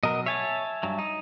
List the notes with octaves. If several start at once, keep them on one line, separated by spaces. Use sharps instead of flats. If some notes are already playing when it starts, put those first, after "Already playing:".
B2 F#3 A#4 D#5
C#5 E5 G#5 A5
G2 F#3
D#4